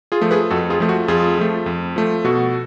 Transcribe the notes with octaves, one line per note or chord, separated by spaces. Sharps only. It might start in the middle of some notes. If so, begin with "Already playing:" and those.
F4 G#4
F3 A3
G#4 B4
F2 F#4 A4
F4 G#4
F3 A3
F#4
F2 F4 G#4
F3 A3
F2
F3 A3
B2 F#4 A4